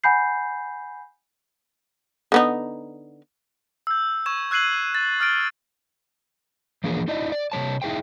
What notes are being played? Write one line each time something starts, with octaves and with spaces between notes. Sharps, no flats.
F#5 G#5 B5 G6 C7
D3 B3 D#4
E6 G6
C#6 G#6 E7
E6 F#6 G#6 C7 D#7 F#7
A6
D#6 F6 A6 D7
E3 F3 A#3 D4 G#4
D#4 E4 D5 D#5
D5
C3 G#3 C#5 A5
D#4 E4 G#4 C5 G5